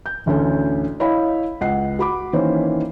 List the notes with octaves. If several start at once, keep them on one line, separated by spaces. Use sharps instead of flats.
G6
A1 D2 D3 C#4 A4
E4 C#5 D#5 F5 B5
C#2 F#5 C7
F#4 B5 D6
D#3 E3 A#3 C#4 C5 C#5